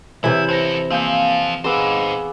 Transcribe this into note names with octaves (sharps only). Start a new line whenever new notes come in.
C3 E3 E4 C#5
C4 A4 C5 A#6
F3 A#3 C4 F5 G#5 G6
B3 D#4 G#4 C5 G#5 D6 E6